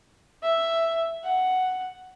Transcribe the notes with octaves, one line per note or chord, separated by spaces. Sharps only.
E5
F#5